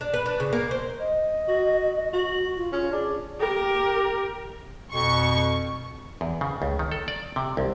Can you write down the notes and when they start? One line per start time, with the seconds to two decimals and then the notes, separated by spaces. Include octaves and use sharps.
0.01 D4
0.14 B4
0.26 D4
0.40 C#3
0.53 A#3
0.71 C5
1.00 D#5
1.48 F#4
2.13 F#4
2.57 F4
2.73 C#4 F4
2.92 D4 G#4
3.40 G4 A#4
4.93 F2 B2 C#6
6.21 E2
6.41 C#3
6.62 C#2
6.79 D#3
6.92 A4
7.08 D5
7.36 C3
7.57 C2